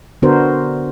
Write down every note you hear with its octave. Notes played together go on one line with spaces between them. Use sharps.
D3 B3 D4 F#4 A#4 C5